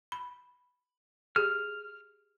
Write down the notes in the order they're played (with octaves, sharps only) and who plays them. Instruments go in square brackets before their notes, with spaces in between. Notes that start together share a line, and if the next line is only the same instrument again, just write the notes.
[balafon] B5
[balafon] G4 G#4 [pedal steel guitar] F6